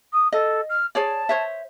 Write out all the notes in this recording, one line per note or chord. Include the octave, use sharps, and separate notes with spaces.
D#6
A4 D#5
F6
G#4 C#5 D5 A5
C5 C#5 E5